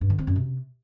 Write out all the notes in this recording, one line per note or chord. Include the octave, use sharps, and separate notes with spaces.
G2
D3
C4
F#2
C3